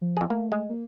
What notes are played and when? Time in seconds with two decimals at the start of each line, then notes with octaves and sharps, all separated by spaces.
0.01 F3
0.17 F2 G#4
0.30 A3 A#3
0.52 G#3
0.69 A#3